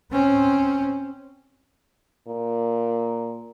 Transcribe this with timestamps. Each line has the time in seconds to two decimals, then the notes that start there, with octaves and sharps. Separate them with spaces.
0.11 C4 C#4
2.27 A#2